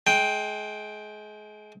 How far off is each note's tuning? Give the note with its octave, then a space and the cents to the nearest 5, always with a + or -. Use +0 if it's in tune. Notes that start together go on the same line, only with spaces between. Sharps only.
G#3 +30 G5 +0